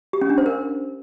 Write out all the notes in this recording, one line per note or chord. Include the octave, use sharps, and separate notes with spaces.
G4
C#4
D4
C5
A#4